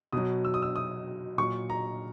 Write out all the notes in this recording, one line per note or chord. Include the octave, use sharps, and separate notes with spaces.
B2 F#3 D#6
E6
D#6
E6
D#6
A#2 F#3 C#6
A#5